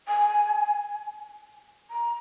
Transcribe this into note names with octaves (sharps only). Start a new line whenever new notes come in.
G#5
A#5